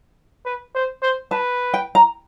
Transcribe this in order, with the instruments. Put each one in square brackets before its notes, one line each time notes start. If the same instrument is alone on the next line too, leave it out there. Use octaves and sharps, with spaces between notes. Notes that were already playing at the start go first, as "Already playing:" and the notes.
[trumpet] B4
C5
C5
[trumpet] B4 [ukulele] A5
[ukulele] G5
A#5